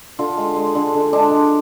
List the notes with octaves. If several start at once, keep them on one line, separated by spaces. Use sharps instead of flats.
D3 F4
G#3
G#3
D3
D3
G#3 D4
G#3